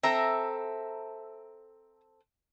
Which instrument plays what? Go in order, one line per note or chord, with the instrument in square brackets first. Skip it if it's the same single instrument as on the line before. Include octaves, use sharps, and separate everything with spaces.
[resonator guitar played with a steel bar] C4 A4 [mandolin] E5 A#5